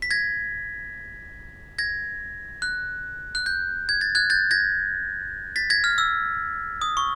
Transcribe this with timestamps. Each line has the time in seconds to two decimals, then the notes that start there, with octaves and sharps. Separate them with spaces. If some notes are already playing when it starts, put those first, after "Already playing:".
0.02 B6
0.11 G#6 A#6
1.78 G#6 A#6
2.62 F#6
3.35 F#6
3.46 G6
3.89 G#6
4.01 A6
4.15 F#6 G#6
4.30 G6 A6
4.51 G#6 A#6
5.56 A6 B6
5.70 G#6 A#6
5.84 F6
5.98 E6
6.81 D#6
6.97 C#6